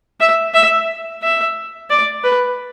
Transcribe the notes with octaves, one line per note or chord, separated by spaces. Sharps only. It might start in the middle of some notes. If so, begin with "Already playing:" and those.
E5
E5
E5
D5
B4